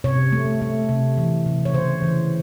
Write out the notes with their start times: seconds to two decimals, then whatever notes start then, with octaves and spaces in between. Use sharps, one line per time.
0.04 C3 C#5
0.32 A3
0.61 A3
0.89 C3
1.18 E3
1.46 C3
1.65 C#5
1.74 C#3 C5
2.02 E3